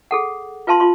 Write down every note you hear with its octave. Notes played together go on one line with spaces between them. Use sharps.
G#4 A4 F#5
F4 B4 F5 A5 C6
F4 C6